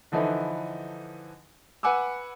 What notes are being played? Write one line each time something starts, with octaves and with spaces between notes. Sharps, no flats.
D3 E3 F3 D#4 A4 B4
B4 F#5 G#5 D6 E6